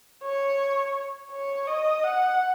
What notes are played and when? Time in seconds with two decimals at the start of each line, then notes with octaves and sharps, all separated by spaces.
0.23 C#5
1.31 C#5
1.67 D#5
2.03 F#5